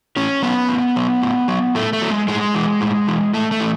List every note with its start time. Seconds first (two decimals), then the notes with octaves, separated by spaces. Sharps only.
0.16 A2 C#4
0.42 F#3 B3
0.69 A2
0.96 F#3
1.22 A2
1.48 F#3
1.75 A2 A3
1.93 A3
2.02 F#3
2.11 G#3
2.28 A2 G#3
2.55 E3
2.81 A2
3.08 E3
3.34 A2 A3
3.52 A3
3.60 E3